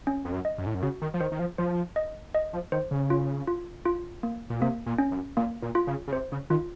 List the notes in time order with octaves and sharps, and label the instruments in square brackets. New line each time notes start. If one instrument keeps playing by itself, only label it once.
[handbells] C#4
[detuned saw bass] F2
F#2
[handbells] D#5
[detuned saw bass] F#2
A2
F#2
[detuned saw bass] C#3 [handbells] F#4
[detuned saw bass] D#3
F3
[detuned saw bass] D#3 [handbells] C5
[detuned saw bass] D#3
F3
[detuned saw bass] F3 [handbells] C5
[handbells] D#5
D#5
[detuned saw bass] F3
[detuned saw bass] D#3 [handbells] C5
[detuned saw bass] C#3
[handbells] F4
F4
F4
A#3
[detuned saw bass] A#2
[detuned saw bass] C3 [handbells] A#3
[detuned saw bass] A#2
[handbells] C#4
[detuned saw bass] F#2
[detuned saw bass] A#2 [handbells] A#3
[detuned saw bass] A#2
[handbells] F4
[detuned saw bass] C#3
C#3
[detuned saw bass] C3 [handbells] C5
[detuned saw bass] C#3
[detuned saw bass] D#3 [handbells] F4